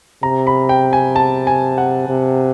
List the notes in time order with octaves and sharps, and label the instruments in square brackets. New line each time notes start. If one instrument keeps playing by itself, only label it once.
[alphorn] C3 [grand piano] A#5
[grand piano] B5
G5
G#5
A5
G#5
F#5
[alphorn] C3